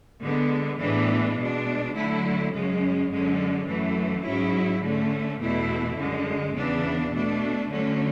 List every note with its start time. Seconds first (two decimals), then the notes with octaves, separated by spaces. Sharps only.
0.21 D3 G#3 B3
0.79 A2 E3 G#3 B3 D4
1.36 B2 G#3 D4
1.94 D3 F#3 A3 E4
2.51 F#2 C#3 G#3 C#4
3.09 F#2 D3 G#3 C#4
3.66 F#2 E3 A3
4.24 G#2 F#3 C#4 E4
4.82 D3 A3 C#4
5.39 E2 B2 A3 E4
5.96 F#2 D3 G#3
6.54 E2 C#3 E3 B3 D4
7.12 B2 A3 D4
7.69 D3 F#3 A3 C#4